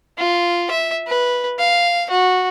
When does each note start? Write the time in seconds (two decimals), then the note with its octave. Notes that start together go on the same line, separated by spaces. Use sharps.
0.18 F4
0.70 E5
1.07 B4
1.59 F5
2.10 F#4